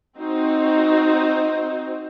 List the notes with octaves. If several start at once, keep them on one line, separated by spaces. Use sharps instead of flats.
C4 D#4 F#4 C5